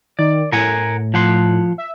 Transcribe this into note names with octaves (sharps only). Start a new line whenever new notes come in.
D#3 D5
A2 A#4 F#5 G#5
F3 F#5 C6
E5